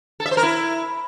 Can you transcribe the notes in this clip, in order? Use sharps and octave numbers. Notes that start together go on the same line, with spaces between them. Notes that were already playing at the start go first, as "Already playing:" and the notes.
A4
E5
C5
A#4
E4